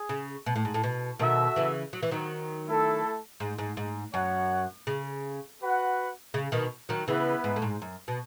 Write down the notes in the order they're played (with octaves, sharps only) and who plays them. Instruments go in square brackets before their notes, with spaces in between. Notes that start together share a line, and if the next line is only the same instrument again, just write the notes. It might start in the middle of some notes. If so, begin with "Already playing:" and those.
Already playing: [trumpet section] G#4
[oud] C#3
B2
A2
G#2
A2
B2
[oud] B2 D#3 [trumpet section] F#4 A4 E5
[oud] C#3 E3
F#3
E3
D#3 F#3
[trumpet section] A3 E4 A4
[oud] G#2
G#2
G#2
[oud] F#2 [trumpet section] F#4 C#5 F#5
[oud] C#3
[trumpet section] F#4 B4 F#5
[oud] C#3
B2 D#3
D#3 F#3
[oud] C#3 E3 [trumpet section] B3 E4 B4 E5
[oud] G#2
A2
G#2
F#2
B2